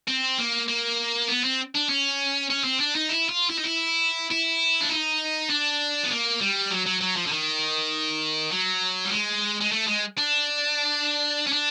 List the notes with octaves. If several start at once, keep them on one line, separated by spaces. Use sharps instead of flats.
C4
A#3
A#3
B3
C4
D4
C#4
C#4
C4
D4
D#4
E4
F4
E4
D#4
E4
E4
D4
D#4
D4
B3
A#3
G3
F#3
F#3
F#3
F3
D3
D#3
F#3
G3
G#3
G#3
A3
G#3
D4
C#4
D4